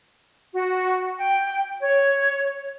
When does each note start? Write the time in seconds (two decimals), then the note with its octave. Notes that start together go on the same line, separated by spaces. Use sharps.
0.53 F#4
1.17 G5
1.81 C#5